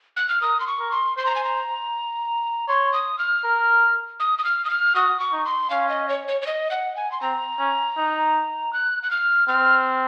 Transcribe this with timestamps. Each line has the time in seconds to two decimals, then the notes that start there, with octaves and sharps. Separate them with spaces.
0.17 F#6
0.29 F6
0.42 A#4 D#6
0.60 C6
0.67 C#6
0.80 A#4
0.92 C6
1.17 C5 C6
1.26 A#5
1.36 G#5
1.45 A#5
2.68 C#5 C6
2.93 D#6
3.19 F6
3.44 A#4
4.20 D#6
4.39 D#6
4.45 F6
4.65 D#6
4.70 F6
4.95 F#4 D#6
5.20 C#6
5.33 D#4
5.45 C6
5.70 C#4 F5
5.89 D#5
6.09 C#5
6.28 C#5
6.42 C#5
6.47 D#5
6.71 F#5
6.96 G#5
7.12 C6
7.21 C4 A#5
7.59 C#4
7.97 D#4
8.73 F#6
9.03 F#6
9.11 F6
9.48 C4 F6